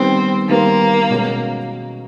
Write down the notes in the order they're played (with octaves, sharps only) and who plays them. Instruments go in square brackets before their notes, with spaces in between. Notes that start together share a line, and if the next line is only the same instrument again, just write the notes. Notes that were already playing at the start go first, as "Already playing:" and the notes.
Already playing: [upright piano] D#3 G3 B3 [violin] C4
[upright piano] D#3 G3 B3 [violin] A#3
[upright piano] B2 G#3 C#4